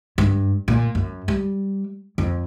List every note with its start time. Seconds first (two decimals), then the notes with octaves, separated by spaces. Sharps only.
0.18 G2
0.68 A#2
0.95 F#2
1.28 G3
2.18 F2